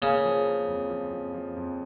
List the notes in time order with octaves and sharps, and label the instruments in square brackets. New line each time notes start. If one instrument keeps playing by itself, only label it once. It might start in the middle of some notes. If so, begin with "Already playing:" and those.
[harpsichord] C#3 [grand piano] A#3
[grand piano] F3
A#3
F2
F3
F2
F3
F2